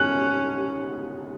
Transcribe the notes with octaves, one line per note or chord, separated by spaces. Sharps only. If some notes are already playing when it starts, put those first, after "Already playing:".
Already playing: C#4 F#6